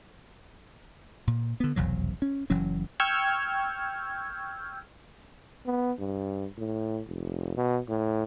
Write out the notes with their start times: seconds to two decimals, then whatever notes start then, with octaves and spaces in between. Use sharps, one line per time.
1.27 A#2
1.60 D3 B3
1.76 F1 B1 E2 F#3
2.22 C#4
2.50 F#1 E3 F#3 C#4
3.00 G5 C#6 E6 F6 G6 G#6
5.66 B3
5.99 G2
6.58 A2
7.07 F1
7.57 B2
7.89 A2